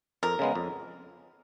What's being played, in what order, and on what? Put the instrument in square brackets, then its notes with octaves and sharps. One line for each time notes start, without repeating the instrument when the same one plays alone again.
[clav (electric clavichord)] F2 [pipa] A#4
[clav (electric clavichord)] C#3 G#3 B3
F2